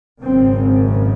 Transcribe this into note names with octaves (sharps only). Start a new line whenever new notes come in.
G#1 F#2 C#3 C4